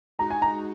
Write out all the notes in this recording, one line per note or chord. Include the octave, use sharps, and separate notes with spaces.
G#3 D#4 F#4 A#5
G#5
A#5